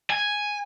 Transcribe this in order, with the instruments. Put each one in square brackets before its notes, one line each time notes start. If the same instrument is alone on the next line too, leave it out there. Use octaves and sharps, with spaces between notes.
[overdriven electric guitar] G#5